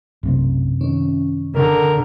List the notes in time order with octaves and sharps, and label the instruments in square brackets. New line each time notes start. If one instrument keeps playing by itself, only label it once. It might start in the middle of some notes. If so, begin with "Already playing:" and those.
[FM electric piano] B1 [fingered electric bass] F#2 C3 C4
[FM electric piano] D#3 C#4
[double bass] D3 [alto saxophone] A#4